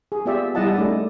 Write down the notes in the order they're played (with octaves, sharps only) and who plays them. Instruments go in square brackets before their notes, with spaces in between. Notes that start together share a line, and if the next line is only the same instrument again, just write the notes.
[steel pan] G#4
B3 F4 G4 D5 E5
G3 E4 G#4 D#5 F#5 A5
A3 C#4 D#4 D5